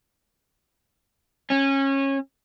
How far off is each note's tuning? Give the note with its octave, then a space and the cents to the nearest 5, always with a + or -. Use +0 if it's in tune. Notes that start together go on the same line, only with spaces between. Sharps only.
C#4 -20